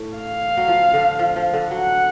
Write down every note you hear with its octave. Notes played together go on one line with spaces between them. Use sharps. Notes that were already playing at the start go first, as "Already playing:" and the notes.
Already playing: A2
F5
F#3
F3
D3
F3
F3
D3
F#3 F#5